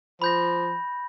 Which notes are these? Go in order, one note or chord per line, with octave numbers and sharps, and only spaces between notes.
F3 B5 G6 A#6